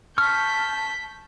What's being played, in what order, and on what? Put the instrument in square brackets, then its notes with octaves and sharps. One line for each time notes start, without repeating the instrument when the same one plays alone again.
[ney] A5 [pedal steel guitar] C#6 F6 [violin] G6 B6